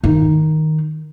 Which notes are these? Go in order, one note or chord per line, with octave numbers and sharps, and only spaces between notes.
D#3 D#4